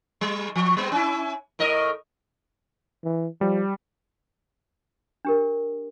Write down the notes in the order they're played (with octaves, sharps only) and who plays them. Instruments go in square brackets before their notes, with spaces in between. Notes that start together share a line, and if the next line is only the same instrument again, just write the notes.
[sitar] G3
F3
G3 B3 C4
C#4 E4
A2 A#4 D#5
[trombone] E3
[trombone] F3 [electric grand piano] G3
[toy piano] D4 G4 A#4